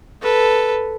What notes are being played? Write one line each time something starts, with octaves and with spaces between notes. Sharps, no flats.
A4 B4